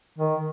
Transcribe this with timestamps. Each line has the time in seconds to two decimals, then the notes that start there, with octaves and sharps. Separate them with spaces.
0.19 D#3